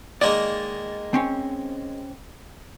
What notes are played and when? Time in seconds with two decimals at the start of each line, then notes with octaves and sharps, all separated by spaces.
0.21 D#3 G#3 A#3 D5
1.14 C4 C#4